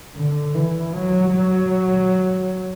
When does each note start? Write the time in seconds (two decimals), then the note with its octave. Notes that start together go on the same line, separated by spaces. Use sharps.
0.16 D3
0.55 E3
0.94 F#3
1.34 F#3